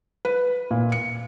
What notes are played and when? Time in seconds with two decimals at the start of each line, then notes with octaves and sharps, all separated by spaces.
0.25 B4
0.71 A#2
0.92 C#7